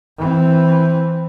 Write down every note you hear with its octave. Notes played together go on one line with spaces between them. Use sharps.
E3 C4